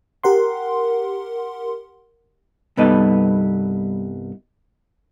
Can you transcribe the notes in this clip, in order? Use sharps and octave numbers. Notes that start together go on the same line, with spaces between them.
G4 A#4 F#5 C6
C2 G2 B3 D#4 A4 D#5